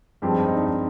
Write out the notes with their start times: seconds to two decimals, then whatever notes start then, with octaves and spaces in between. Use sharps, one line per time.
0.22 G2 F3 G#3 C4 G4
0.33 D#4
0.44 D#4
0.55 D4
0.66 D#4